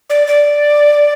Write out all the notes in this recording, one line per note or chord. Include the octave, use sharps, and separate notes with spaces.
D5
D5